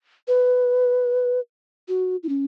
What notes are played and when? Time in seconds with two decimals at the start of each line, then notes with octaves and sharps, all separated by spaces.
0.28 B4
1.88 F#4
2.23 E4
2.29 C#4